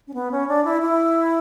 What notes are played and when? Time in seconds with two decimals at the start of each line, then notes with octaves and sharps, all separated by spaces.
0.08 C#4
0.14 B3
0.32 C#4
0.48 D4
0.65 E4
0.82 E4